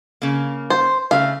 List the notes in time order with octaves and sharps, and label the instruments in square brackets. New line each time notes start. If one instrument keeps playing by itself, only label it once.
[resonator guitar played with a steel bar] C#3 A#3
[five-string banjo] C5
[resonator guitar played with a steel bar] C#3 A3 [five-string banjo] F5